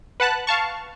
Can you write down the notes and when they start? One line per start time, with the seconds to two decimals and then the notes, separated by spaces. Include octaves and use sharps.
0.20 B4 F#5 A5 F#6
0.47 F5 A5 C#6